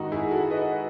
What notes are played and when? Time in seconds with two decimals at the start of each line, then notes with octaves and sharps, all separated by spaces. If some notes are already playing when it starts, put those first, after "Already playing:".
Already playing: G#2 D#3 D#4 F#4
0.12 E4 G#4
0.31 F#4 A4
0.50 B4 D#5